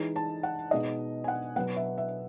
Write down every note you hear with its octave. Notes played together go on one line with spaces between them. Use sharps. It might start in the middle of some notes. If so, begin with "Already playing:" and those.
Already playing: E3 G#3 D#4
A5
F#5
B2 G#3 D#4 D#5
G#5
F#5
B2 F#3 B3 F#5
E5
E5